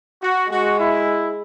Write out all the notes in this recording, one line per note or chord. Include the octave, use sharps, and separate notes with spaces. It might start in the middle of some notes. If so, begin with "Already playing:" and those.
F#4
G#3 F#4
E4